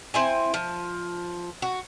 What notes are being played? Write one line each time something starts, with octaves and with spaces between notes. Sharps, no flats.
C4 E4 G#5
F3
F#4